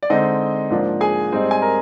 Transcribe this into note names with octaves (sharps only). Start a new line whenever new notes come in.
D5
D3 G#3 C4 D#4 D#5
G#2 F3 A#3 D4
G#4 G#5
G#2 G3 C4 D#4
G#5
A#4 A#5